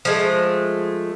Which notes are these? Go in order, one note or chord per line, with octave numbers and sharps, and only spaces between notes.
F3 G#3 A3